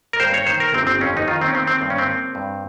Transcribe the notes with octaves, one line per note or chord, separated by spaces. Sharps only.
A#4
G2 C5
C#5
D#3 C5
A#4
G1 C4
C4
F2 C#4
D#4
D#3 F4
C4
C#4
D#3 C4
C4
G2 C4
C#4
C4
A#3
G2